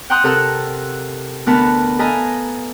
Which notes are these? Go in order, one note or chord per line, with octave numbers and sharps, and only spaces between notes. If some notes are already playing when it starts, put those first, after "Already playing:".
F#5 G5 A#5 C6 D#6 F#6
C3 A4 A#4 F#5 E6 F#6
D2 B3 A#4 F#5 A5 B5
A4 B4 D#5 F5 G#5 A#5